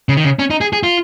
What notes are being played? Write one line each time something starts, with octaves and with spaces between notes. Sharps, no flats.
C#3
D#3
C#3
C#4
D#4
G#4
G#4
F4